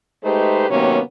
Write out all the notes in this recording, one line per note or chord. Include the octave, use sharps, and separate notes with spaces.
G#3 A3 D#4 G4 B4 C5
C3 D#3 F#3 A#3 B3 C#4